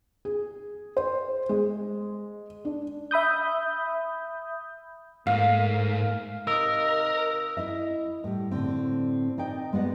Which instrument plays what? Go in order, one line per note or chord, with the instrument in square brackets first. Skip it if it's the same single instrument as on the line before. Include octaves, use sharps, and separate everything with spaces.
[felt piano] G#4
C5
G#3
D4
[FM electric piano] E5 B5 D#6 G6
[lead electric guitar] G#2 [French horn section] A3 A#3 [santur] F5
[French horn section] C3 D#4 D#5 [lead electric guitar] A#4 [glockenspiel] D#6 E6
[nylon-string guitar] E4 D#5 E5
A2 G3
A2 D3 C4
D#4 D5 D#5 G5
G#3 B3 D5 D#5 F#5